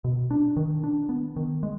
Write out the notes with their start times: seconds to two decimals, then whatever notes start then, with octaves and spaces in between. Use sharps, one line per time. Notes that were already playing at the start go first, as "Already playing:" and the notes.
0.04 B2
0.31 D4
0.56 D#3
0.84 D4
1.09 B3
1.36 D#3
1.63 G#3